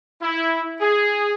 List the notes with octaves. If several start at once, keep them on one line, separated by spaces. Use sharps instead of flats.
E4
G#4